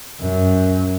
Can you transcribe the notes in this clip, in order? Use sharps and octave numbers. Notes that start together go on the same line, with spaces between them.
F#2